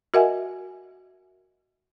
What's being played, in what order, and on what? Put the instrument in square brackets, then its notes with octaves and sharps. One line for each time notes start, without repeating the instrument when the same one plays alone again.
[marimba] F#4 A#4 D#5 E5 F#5 G#5